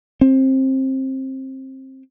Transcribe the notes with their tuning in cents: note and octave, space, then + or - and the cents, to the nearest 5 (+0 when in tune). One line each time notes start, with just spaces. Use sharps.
C4 +20